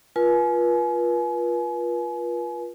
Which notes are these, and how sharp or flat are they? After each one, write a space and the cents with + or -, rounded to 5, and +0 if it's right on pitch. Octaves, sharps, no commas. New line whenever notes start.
F4 +0 B4 -35 G#5 +35